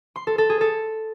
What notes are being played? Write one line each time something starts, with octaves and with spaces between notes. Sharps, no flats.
C6
A4
A4
G#4
A4